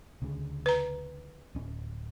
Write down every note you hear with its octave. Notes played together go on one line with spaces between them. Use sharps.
D2 C#3
B4 A#5
D1 C#4